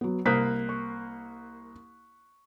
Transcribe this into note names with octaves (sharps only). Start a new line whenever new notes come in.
F#3 B3
C2 A#3 C5 D#6 F#6 B6
C#6